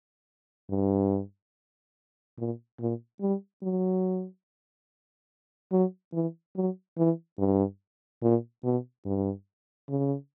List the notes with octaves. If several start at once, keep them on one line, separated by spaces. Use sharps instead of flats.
G2
A#2
A#2
G3
F#3
F#3
E3
F#3
E3
G2
A#2
B2
G2
C#3